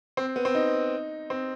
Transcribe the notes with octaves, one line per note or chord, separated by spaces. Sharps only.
C4
B3
C4
D#4
C4